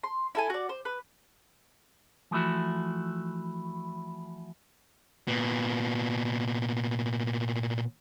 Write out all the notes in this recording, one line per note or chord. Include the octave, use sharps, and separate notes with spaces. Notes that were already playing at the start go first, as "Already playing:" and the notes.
C6
E4 A4 G#5
F#4 D5
C5
B4
E3 F3 A3 E4 F#4
A#2 B3